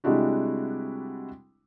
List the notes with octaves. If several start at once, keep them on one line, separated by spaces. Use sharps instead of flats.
C3 G3 G#3 D4 E4 F#4